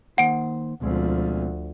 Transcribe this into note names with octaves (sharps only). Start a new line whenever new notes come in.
D#3 A#3 C5 F#5 D7
D2 B2 F3 G#3 C4